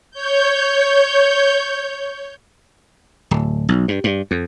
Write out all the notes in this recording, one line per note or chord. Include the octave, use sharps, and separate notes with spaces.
C#5 G6
D1
B1
G2
G2
F2